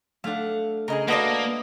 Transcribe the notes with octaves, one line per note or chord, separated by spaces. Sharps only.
A3 D4 F5 F#5
C#3 G#4 A#4 D#5
A3 A#3 F#4 A4 B4 D5 D#5